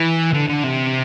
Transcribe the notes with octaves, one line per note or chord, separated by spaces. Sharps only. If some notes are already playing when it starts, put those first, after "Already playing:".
Already playing: E3
D3
D3
C3